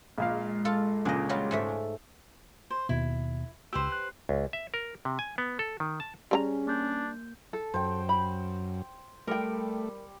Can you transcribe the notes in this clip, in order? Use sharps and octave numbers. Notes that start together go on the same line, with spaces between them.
A#1 A#2 G#3 F5
F4 A4
C#2 A#2 C#3 D4 D#5
F#3 G3 F4
G#2 A3 E5
C5
D#2 B2 E4
C#2 G4 B4 C5 E6
F#6
C#2
E5
A#4
C3
G#5
B3
A4
D#3
A5
G3 C#4 G#4 A#4 A#5
A#3 D4 G6
A4
F#2 C5 G5
B5
G3 A3 A#4 G5